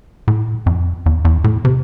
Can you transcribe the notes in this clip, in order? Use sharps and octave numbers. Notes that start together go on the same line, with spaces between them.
A2
F2
E2
E2
A2
C3